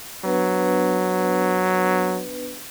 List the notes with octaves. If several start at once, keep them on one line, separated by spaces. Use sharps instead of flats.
F#3 B3 D4 B4